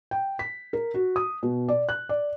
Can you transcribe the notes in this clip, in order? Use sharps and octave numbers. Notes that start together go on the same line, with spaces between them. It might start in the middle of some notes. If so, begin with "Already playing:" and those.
G5
B6
A#4
F#4
D#6
B2
D5
F#6
D5